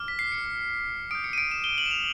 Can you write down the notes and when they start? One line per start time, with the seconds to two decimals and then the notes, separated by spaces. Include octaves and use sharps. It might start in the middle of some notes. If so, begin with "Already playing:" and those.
Already playing: D6 F6
0.08 B6
0.19 C7
0.32 C#7
1.11 D#6 G6 D7
1.24 C#7
1.33 D#7
1.38 D7
1.51 E7
1.64 G7
1.78 F#7
1.86 E7
1.91 F7